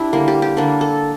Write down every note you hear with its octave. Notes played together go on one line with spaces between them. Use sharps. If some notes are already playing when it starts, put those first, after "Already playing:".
Already playing: D4 E4 G4
D3 G3 A#3
G4
G4
D3 G3 A#3 D4
A4